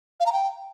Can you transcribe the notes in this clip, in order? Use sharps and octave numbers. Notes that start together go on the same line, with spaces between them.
F5
A#5
G5